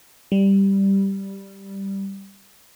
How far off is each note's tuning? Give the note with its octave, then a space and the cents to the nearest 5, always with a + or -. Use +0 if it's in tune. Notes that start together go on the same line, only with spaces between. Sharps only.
G3 +0